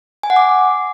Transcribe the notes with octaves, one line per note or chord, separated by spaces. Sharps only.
G#5
F#5
D6